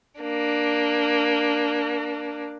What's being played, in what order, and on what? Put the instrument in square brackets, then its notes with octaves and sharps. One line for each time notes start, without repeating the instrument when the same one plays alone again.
[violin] A#3 D4